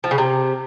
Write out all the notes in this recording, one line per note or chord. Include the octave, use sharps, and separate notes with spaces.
F3
C#3
C3